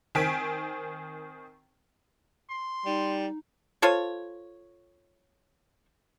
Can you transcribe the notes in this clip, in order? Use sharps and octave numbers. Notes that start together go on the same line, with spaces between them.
D#3 C4 G#5 B6 D7
C6
G3 D#4
F4 A4 C5 C#5